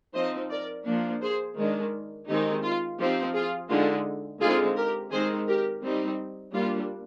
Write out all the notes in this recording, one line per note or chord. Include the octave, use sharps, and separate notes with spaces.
F3 C4 D#4 C5 D#5
A#4 D5
F3 A#3 D4
G#4 C5
D#3 G#3 D4
D#3 G#3 C4 D#4 G4
F4
F3 C4 D#4 G4
F4 G#4
D3 G#3 D#4 F4
D3 G#3 C4 D#4 F4 G#4
G4 A#4
D#3 G#3 C4 D#4 G#4 C5
G4 A#4
G3 C4 D#4
G3 A#3 D4 F4